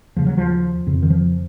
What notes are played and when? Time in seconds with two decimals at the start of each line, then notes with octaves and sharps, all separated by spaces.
0.16 D#2 C#3 F3
0.27 F#3
0.38 F3
0.87 F2 C#3
1.02 D#3
1.10 F3